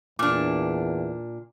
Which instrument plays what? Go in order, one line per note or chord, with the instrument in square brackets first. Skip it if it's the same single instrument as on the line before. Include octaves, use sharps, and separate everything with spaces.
[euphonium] E2 [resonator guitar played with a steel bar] A#2 D4 [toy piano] D6